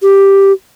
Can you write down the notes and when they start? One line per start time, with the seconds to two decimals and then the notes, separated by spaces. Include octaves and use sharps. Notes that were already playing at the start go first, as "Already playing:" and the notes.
0.02 G4